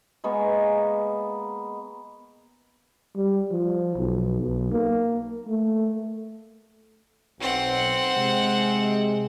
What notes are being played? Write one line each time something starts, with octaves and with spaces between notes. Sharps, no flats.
G#3 A#3 B3 C#6
G3
F3
B1
B1
A#3
A3
B1 C4 F#5
C3 G#3